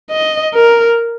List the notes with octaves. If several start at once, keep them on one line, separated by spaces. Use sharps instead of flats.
D#5
A#4